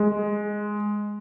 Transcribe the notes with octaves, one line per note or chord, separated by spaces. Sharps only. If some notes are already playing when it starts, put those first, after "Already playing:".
Already playing: G#3